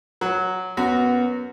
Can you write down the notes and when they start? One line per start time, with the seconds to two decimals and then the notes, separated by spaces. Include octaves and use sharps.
0.21 F#3
0.77 F#2 B3 F#4